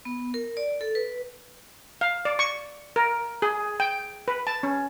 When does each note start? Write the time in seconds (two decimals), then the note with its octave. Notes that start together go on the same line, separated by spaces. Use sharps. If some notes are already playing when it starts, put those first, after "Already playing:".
0.05 B3
0.34 A#4
0.57 D5
0.81 A4
0.95 B4
2.01 F5
2.25 D5
2.39 C#6
2.96 A#4
3.42 G#4
3.80 G5
4.28 B4
4.47 A5
4.63 C#4